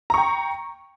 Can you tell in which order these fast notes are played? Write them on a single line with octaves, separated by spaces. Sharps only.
A#5 C#6 G5